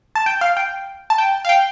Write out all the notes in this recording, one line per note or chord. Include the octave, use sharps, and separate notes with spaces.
A5
G5
F5
G5
A5
G5
F5
G5